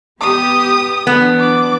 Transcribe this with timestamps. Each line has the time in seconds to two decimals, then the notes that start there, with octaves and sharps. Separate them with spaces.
0.21 B3 G4 D#6
1.07 E3 F#3 B3 D4
1.40 D6